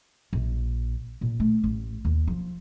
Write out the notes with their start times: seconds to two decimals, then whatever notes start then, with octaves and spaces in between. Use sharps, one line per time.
0.33 A#1
1.21 A#2
1.40 A3
1.64 A1
2.05 D#2
2.27 F3